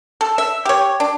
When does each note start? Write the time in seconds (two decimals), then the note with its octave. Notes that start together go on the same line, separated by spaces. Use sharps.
0.21 A4
0.38 E5
0.65 G4 C#5
1.00 D4